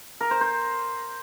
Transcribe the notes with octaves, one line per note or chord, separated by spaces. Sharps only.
A#4
C5
C5